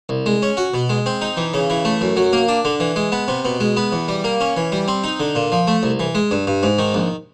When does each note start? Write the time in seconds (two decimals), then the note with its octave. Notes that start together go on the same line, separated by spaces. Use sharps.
0.09 C2
0.26 G#3
0.42 C#4
0.57 F#4
0.74 B2
0.89 G#3
1.06 C4
1.22 D#4
1.37 E3
1.54 C#3
1.70 E3
1.85 A3
2.01 F#2
2.17 F#3
2.33 A#3
2.48 D4
2.65 D3
2.80 E3
2.96 G#3
3.12 B3
3.28 C3
3.45 B2
3.60 G#3
3.77 B3
3.92 E2
4.08 G3
4.24 A#3
4.41 C#4
4.57 E3
4.72 G3
4.88 C4
5.04 D#4
5.20 D3
5.35 A#2
5.52 F3
5.67 A3
5.83 C2
6.00 E3
6.15 G#3
6.31 G2
6.47 G2
6.63 G#2
6.78 D#3
6.94 A#1